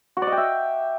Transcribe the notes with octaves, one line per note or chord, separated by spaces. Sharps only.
F#4
D5
D#5
G5
E5